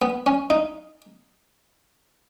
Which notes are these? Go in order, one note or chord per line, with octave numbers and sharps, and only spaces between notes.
B3
C#4
D#4